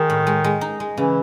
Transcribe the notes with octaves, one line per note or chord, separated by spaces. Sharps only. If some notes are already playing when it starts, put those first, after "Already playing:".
Already playing: D#3 G#3 D#4
A2
G#3
G#3
D#4
G#3
C#3 E3